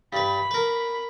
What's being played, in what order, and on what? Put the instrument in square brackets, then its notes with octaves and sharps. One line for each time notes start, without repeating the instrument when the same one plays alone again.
[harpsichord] G2 B4 [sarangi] B5
[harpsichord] A#4 B4